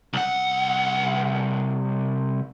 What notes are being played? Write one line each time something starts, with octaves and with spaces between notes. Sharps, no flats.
C2 F#5